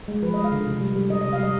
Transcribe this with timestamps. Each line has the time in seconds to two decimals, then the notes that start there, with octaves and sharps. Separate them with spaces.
0.08 G#3
0.23 F3 B4
0.34 G#3 D#5
0.44 F5
0.52 D3
0.67 C3
0.81 G3
0.96 G3
1.10 G3 D#5
1.21 D#5
1.25 C3
1.33 F5
1.40 G3 D#5